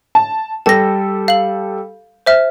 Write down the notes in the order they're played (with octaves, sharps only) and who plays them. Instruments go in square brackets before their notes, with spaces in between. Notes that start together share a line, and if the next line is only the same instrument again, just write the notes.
[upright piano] A5
[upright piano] G3 G4 A4 [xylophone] A5 A#6
[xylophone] F5 F#7
C5 E5 F6